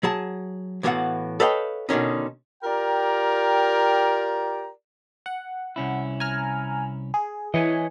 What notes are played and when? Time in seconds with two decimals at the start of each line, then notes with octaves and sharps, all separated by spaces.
0.03 F#3 G#4 A5
0.83 A2 E3 B3 F#4 F5 F#5
1.40 A4 B4 C#5 D#5 F5 G5
1.89 B2 D3 D#3 C#4 D#4
2.64 F4 G4 A#4 D5 G5 A#5
5.26 F#5
5.76 C2 C#4 E4
6.20 G#5 A#5 F6
7.14 G#4
7.54 E3 E4 C#5 D#5 G#5